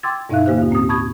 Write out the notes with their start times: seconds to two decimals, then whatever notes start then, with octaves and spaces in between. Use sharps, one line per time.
0.03 G5 C6 D6 E6 G#6 A6
0.29 G2 B2 D#4 E5 F5 F#6
0.46 D3 A#3 G4 C5 F#6
0.58 D#2 F4
0.71 A2 C4 G4 D#6
0.89 A5 B5 C#6 D#6 G#6